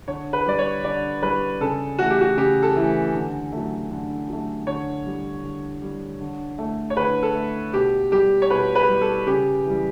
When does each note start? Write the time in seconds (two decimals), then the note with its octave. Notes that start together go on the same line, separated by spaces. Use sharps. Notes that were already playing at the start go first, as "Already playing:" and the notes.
0.08 D3 C#5
0.33 B4
0.46 G3 D5
0.59 C#5
0.84 D3 D5
1.22 G3 B4
1.61 C#3 A4
1.99 E3 A3 F#4
2.10 G4
2.21 F#4
2.37 C#3 G4
2.62 A4
2.76 E3 A3
3.14 D3
3.53 F#3 A3
3.91 D3
4.29 F#3 A3
4.67 D3 C#5
5.06 G3
5.43 D3
5.82 G3
6.20 D3
6.58 A3
6.90 C#5
6.97 D3 B4
7.23 A4
7.35 A3
7.73 B2 G4
8.11 G3 G4
8.42 C#5
8.50 B2 B4
8.75 B4
8.89 G3
9.01 A4
9.27 C#3 G4
9.65 E3 G3